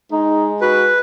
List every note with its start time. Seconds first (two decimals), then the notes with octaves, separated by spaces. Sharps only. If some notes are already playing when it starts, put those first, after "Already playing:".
0.12 G#3 D#4
0.61 F#4 B4